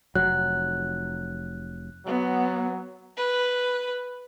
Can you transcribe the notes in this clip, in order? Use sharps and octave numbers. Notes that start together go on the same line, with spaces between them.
F1 F#3 F#6
F#3 B3
B4